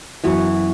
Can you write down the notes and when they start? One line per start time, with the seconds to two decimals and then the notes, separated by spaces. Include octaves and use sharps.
0.24 F#2 E3 B3 F#4